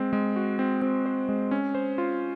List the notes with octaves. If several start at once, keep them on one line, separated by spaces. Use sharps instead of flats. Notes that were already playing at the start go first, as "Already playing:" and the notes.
Already playing: G#3 C4
G#3
F#4
C4
C4
C5
G#3
C#4
C5
F4